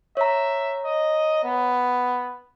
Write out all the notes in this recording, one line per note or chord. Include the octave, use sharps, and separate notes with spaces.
C#5 E5 A#5
D#5
B3